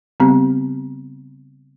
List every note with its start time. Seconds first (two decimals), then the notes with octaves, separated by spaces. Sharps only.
0.20 C#3 G3 B3 C4 G4